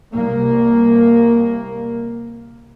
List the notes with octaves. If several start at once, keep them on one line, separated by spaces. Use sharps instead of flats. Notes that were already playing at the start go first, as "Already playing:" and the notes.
C2 A#3